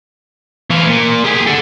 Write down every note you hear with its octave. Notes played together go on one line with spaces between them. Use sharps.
E3 F4
A#2
G4 G#4
A4 F#5